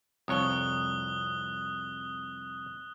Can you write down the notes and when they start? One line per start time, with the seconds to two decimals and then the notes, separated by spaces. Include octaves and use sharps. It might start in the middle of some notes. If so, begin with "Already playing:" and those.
0.28 C2 F2 C#5 D#6 F#6 G7